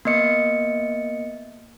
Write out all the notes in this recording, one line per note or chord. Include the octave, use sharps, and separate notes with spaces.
A#3 B3 D#5 C#7